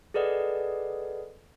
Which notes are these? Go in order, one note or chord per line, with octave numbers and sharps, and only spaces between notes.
G#4 A4 B4 D5 D#5 F#5